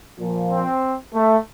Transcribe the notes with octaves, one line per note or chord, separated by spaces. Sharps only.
A#2 F3
C4
A3